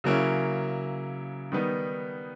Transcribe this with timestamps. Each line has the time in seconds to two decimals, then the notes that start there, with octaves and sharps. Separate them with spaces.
0.04 C#3 F#3 A#3 C#4 E4
1.52 D#3 G3 B3 D#4